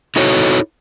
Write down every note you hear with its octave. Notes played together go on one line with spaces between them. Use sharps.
D#4 E4 F#4 A4 C#5